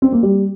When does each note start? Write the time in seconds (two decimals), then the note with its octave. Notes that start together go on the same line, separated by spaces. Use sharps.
0.02 C4
0.12 A#3
0.23 G3